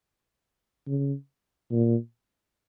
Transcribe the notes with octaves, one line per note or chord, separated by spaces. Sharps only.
C#3
A#2